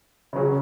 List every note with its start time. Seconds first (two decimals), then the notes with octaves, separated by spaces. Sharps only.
0.33 C#3 F#3 C#4 G#4